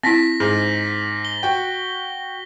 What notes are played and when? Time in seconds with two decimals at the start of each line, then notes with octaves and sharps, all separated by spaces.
0.03 C4 E4 A#6 B6
0.40 G#2 G#4
1.25 G7
1.43 F#4 G5